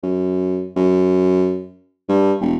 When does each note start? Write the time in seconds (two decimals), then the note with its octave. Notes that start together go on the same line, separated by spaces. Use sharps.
0.03 F#2
0.76 F#2
2.09 G2
2.41 E1